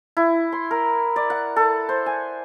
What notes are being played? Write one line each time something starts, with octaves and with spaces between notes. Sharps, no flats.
E4
C6
A#4
D5
F#5
A4
C5
G#5